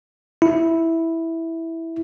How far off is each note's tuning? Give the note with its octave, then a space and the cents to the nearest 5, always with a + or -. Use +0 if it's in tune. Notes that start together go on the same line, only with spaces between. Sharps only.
E4 -5